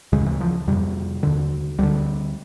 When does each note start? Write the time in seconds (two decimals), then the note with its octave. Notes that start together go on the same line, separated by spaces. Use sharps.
0.12 D2 C#3 G#3
0.26 E3
0.40 F3
0.67 F2 C3 G3
1.23 D#2 D3
1.79 D2 D3 G3